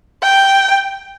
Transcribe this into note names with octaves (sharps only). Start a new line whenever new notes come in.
G5